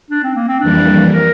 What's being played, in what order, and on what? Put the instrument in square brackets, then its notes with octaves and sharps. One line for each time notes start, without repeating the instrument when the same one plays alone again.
[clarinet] D4
C4
A#3
C4
[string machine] F2 E3 G3 A#3 [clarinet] D4
[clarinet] A#4